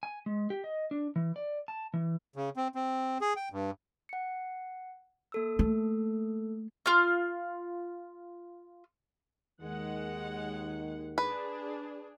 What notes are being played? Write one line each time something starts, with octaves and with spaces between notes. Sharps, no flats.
G#5
G#3
G4
D#5
D4
E3
D5
A5
E3
C#3
C4
C4
G#4
G5
G2
F#5 C#7
A#3 A4 E6
A3
F4 F6
D#2 D#3 G#3 F#5
D4 G#4 B4